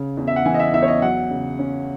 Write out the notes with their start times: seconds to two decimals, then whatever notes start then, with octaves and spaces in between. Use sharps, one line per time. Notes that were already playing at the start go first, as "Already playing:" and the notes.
Already playing: C#3
0.17 E2
0.27 E5
0.36 F#5
0.46 E3 G#5
0.54 D#5
0.59 E5
0.74 E2 E5
0.83 C#5
0.88 D#5
1.02 F#3 F#5
1.30 C#3
1.59 C#4